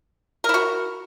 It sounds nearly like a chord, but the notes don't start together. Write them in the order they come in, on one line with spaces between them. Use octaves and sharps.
A#4 E4 F#4